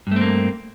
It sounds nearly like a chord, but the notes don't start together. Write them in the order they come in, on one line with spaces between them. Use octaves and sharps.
G2 A3 C4 A#3